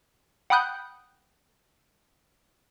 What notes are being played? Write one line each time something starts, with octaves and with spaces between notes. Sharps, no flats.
F#5 G5 B5 D#6 F#6 G6